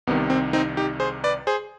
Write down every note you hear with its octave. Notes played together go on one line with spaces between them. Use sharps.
C2 C3 D#3 B3
C4
C4 D#4
D#4 G4
G#4 C5
B4 D5
G#4 C5